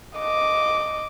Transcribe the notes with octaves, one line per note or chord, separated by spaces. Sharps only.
D#5 D6